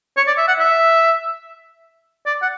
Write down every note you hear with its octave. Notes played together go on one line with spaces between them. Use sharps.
C#5
D5
E5
F#5
E5
D5
F#5